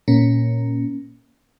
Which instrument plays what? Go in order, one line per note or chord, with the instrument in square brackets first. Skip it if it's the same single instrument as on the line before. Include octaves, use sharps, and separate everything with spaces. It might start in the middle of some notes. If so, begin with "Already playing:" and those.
[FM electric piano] A#2 A#3 C#4